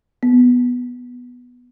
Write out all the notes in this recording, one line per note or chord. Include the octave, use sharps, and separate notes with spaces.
B3